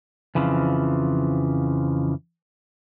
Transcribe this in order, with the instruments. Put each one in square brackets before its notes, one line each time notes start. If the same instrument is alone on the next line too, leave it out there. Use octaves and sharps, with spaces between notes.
[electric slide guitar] F2 C#3 E3 F3